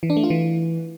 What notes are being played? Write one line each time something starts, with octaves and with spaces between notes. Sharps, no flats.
E3
D4
A3
F4
E3